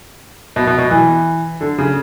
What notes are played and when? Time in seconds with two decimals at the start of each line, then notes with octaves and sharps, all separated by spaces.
0.56 B2
0.67 B2
0.78 B2
0.90 E3
1.61 D3
1.78 C#3